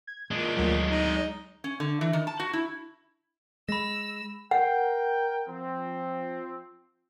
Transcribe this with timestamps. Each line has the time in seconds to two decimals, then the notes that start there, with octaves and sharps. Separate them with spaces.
0.07 G#6
0.31 A#2 G#3 D4
0.55 D2 A#2 F#3 B6
0.89 D#4
1.64 C#4
1.80 D3
2.01 E3
2.13 D#3
2.27 A5
2.40 F#4
2.53 E4
3.69 G#3 B5 E6 A#6
4.51 A#4 F#5 G5
5.48 F3 C4